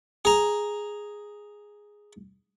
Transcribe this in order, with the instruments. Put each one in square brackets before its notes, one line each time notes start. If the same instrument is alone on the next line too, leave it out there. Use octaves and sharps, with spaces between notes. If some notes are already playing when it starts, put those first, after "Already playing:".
[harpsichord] G#4 A#5